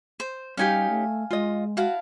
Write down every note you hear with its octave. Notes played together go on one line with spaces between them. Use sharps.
C5
G3 C#4 D#4 G4 F5 G#5
A3
G#3 F4 D#5
E4 F#4 F5 A5